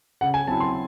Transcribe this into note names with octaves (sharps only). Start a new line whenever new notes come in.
C#3 F#5
G#5
F#3 C4 E4 A5
C6